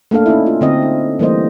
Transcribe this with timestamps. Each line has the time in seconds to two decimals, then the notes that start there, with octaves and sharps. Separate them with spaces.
0.11 A3 A#3 D4 A4 F5
0.26 C#4 D#4 E4
0.46 F4
0.61 D3 C4 D#5
0.82 D#4
1.19 E3 G3 A3 A#3 C5 D#5